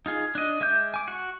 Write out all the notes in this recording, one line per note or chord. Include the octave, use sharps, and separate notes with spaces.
D#4 F4 G#4
D4 D#5
G#3 E5 D6 G6
G#5 D6
F#4 C#6